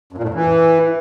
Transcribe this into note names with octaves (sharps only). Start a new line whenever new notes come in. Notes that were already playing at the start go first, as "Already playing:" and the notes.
F#2
A#2
A2
F#2
E3